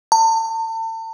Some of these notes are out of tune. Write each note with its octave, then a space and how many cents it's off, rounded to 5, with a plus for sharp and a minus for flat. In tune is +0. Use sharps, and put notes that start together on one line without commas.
A5 +40